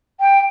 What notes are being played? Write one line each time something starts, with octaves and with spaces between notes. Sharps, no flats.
G5